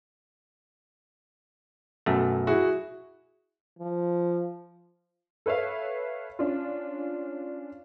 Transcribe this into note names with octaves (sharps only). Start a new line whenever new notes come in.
B1 F#2 A3
E4 F#4 G#4
F3
A4 B4 C#5 E5 F5
C#4 D4 F4